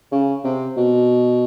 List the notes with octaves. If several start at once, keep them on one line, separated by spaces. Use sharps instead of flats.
C#3
C3
B2